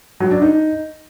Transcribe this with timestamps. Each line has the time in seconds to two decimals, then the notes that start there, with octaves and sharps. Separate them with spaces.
0.20 F#3
0.31 D4
0.42 D#4